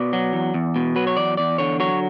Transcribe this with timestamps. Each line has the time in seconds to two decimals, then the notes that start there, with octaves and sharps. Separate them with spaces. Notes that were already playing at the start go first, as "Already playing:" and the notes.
Already playing: B2 D5
0.13 F#3
0.33 E2
0.54 E2
0.76 B2
0.96 F#3 B4
1.07 C#5
1.17 E2 D5
1.37 E2 D5
1.58 D3 C#5
1.80 F#3 C#5